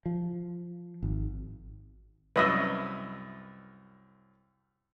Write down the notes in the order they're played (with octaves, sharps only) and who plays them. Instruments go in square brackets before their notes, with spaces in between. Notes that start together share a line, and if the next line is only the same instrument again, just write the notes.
[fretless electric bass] F3
G#1
[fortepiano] C2 F#2 D#6 [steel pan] B4 D#5 E5